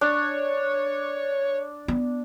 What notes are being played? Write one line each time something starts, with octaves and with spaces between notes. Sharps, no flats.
D4 C#5
B3